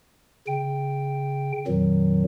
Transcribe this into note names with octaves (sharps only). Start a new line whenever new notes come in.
C#3 G5
F2 A#2 D#3 F#3